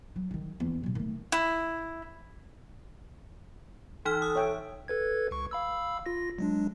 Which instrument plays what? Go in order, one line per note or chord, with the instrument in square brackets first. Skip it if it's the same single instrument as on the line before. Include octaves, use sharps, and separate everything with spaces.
[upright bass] F#3
D3 D#3
E2 D4
B2 F#3
D#3 A3
[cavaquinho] E4
[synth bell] E3 D#4 F6 [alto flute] A4
[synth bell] D#6
[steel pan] C#5 E5 G5
[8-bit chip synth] A4 B4 G#6
C#2 C#6
F5 B5 E6
F4 A#6
F#3 G#3 D4